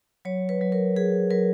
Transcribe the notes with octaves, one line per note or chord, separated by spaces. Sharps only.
F#3 C#5
B4
F#3
A#4
F#3 G#4
F#3 A#4